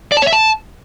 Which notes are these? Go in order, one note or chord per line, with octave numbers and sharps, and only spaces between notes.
D5
A5
C#5
E5
A5